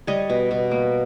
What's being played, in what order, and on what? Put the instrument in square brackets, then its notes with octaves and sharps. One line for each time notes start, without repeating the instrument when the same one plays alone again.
[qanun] G3 C#5 D#5
B2
B2
A#3